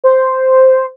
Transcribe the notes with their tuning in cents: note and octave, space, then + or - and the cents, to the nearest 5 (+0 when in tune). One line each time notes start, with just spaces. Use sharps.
C5 -5